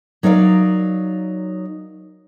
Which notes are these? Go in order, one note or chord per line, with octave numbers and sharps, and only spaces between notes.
F#3 D#4 A#4 D5 F5